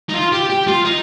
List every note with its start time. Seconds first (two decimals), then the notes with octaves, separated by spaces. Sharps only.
0.09 D#4
0.14 F4
0.33 G4
0.50 G4
0.68 F4
0.85 D#4